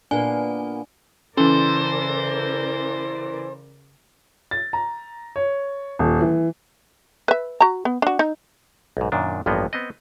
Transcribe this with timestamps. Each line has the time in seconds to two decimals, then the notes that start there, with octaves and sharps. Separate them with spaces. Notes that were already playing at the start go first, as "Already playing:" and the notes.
0.11 A#2 A#3 B3 D4 G#5
1.37 C#3 E3 C#4 A4 A#4 C5 D5
4.51 A6
4.73 A#5
5.36 C#5
5.99 D#1
6.21 E3
7.28 B4 E5
7.60 F#4 A#5
7.85 B3
8.02 D4 F#4
8.19 D#4
8.97 B1 G#2
9.12 F#2 A#2 D#3 D4
9.46 A1 G2 F3 A#3 B3 D#5
9.73 B3 C4 D#5